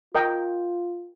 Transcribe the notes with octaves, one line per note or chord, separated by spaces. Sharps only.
F4 A#4 D#5 G5